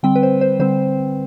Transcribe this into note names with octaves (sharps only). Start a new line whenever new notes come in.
D3 G3 C4 G5
B4
C5
C5
D3 G3 C4 C5